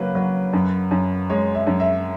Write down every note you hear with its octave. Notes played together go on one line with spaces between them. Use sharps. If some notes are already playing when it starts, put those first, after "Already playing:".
Already playing: C#3 F#3 A#3 B4
F#3
F#2
F#2
G#3 C#5
E5
F#2
E5